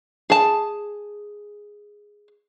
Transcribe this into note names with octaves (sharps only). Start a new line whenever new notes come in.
G#4 A5